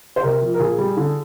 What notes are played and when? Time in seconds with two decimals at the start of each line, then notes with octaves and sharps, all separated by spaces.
0.16 C5
0.23 C3 A#4
0.42 F3
0.54 A#4
0.59 A#2 G#4
0.78 G3
0.97 D3